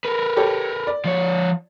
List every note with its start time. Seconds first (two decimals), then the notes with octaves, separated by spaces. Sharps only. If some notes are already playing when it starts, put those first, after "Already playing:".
0.04 A#4 B4
0.37 G4 A4 C#5
0.87 D5
1.05 F3 C#5